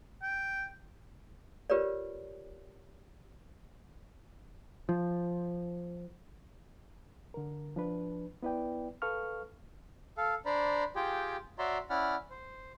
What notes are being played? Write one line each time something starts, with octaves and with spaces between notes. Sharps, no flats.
G5
F4 G4 A#4 B4 C#5 D5
F3
D3 A#4
F3 D4 B4
B3 E4 B4 D5 G5
A4 B4 F5 C#6 F6
A4 F5
D4 C5 D5 A#5 B5
F4 G4 G#4 G5
F#4 C#5 D5 E5 A#5 C6
C#4 E4 D5 F#5 B5 F6
C5